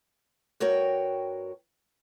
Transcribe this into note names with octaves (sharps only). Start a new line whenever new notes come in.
G2 F#4 A#4 C#5 G5